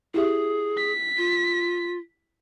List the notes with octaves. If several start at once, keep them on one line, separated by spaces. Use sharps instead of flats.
E4 G4 G#4 E5
B6
F4